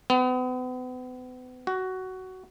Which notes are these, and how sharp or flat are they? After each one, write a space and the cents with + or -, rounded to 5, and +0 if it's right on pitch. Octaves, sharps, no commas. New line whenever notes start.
B3 +40
F#4 +15